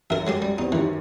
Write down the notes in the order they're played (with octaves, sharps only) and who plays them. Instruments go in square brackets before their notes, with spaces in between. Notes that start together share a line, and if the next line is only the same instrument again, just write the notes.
[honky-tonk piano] F#2 [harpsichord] A#4 E5
[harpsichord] F#3 G#3 G4
G3
[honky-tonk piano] E2 G3 C4 [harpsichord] D#4
[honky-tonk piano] F#2 D#3 G4 [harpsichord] E3